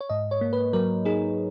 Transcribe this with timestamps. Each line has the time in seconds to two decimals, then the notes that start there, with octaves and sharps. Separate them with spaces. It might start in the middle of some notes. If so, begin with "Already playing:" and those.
0.01 C#5
0.09 G#2 D#5
0.31 C#5
0.41 A#3
0.53 B4
0.73 F#3 A#4
1.05 D#4 G#4